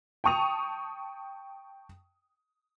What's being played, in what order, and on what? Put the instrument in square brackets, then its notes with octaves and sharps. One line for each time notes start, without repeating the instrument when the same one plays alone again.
[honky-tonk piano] G5 A5 C#6 D#6 F7